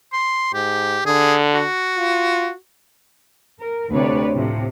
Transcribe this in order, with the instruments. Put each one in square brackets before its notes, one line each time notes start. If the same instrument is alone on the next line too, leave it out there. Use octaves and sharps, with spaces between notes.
[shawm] C6
[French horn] G#2 [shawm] G4
[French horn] D3 [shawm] G#4
[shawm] F#4
[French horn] F4
[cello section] A#4
D2 C3 B4 C#5 D5
A2 C3 F3